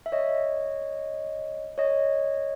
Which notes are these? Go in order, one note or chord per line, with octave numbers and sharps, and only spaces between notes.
E5
C#5 D#5
C#5 D#5